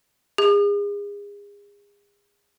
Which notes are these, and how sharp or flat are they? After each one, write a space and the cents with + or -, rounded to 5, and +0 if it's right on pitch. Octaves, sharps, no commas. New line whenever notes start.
G#4 -35